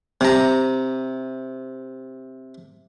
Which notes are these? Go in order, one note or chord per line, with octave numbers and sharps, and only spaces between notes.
C3 A#5